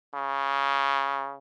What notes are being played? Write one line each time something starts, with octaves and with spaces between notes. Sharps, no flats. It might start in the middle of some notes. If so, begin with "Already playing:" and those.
C#3